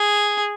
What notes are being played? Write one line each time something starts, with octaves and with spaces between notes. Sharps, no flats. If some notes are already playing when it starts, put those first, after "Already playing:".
Already playing: G#4